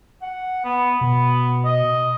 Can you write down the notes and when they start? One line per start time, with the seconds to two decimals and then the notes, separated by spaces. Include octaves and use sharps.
0.22 F#5
0.65 B3
1.01 B2 B3
1.65 D#5